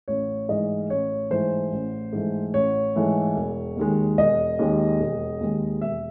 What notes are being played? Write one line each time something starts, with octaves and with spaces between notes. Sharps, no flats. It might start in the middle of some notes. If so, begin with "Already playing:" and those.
A1 C#5
G#2 E3 A3 D#5
A1 C#5
G#2 E3 A3 C5
A1
G#2 E3 A3
A1 C#5
G#2 E3 A3
E1
D#2 D#3 G#3
E1 D#5
D#2 D#3 G#3
E1
D#2 D#3 G#3
E1 E5